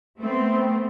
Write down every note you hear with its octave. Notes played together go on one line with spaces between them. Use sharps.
A3 B3 C4